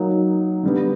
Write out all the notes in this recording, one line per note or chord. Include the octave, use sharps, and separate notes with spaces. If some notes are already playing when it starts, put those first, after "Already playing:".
Already playing: F#3 A#3 D#4
D3 G3 B3